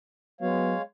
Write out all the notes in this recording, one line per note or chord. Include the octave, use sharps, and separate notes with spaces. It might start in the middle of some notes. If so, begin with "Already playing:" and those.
F#3 G#3 B3 C#5 F5